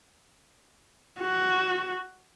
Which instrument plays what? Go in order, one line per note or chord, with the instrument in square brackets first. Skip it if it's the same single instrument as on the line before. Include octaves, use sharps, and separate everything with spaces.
[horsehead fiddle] F#4